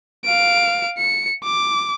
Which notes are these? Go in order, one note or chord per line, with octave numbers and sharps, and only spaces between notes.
F5 D7
C#7
D6